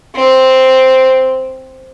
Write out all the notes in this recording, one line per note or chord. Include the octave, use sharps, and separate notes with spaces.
C4